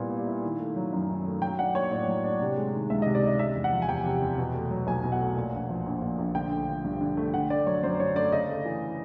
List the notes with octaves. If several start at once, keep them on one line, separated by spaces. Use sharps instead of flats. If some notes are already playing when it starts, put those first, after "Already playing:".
Already playing: A#2 G3 B3 E4
G3
E4
D#3
A3
F#3
F#2
D#3
A3
F#3 G5
D4 F#5
A#3 C#5
A2 D5
F#3
D4
C3
G#3
D#3
C#2 E5
D#5
C3
D5
G#3 D#5
C3 E5
E2
F#5
F3
G#5
E2 G5
C3
E2
B2
A3
F#3
B1 G#5
B2
F#5
A3
A#2
A#1
F3
A#1
A#2
A#1
D3 G5
A3
F3
G2
D3
A3
D3 F#5
A3 D5
F#3 C#5
F#2 C5
D3 C#5
A3 D5
C#3 D#5
A3
E3